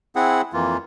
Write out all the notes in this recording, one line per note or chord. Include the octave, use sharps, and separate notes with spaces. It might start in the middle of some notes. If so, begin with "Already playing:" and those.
C4 E4 G#4 F#5
F2 E3 A#3 F4